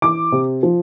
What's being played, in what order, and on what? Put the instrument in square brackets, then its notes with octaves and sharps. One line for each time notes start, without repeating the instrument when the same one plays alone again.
[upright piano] E3 D6
C3
F3